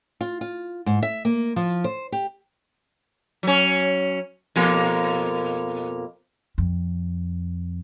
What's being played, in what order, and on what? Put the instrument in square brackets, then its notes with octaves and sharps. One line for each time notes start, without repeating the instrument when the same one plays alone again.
[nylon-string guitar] F4
F4
G#2
E5
A#3
F3
C5
G4
[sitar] F#3 C#4
F2 B2 A#3
[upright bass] F2